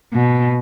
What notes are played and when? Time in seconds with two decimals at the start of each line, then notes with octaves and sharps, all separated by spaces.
0.13 B2